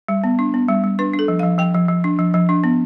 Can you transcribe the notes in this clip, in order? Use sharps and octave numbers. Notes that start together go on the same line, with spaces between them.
G3
B3
D4
B3
G3
G3
D4 B4
D4
A4
F3
F3 F5
F3 G5
F3
F3
D4
F3
F3
D4
B3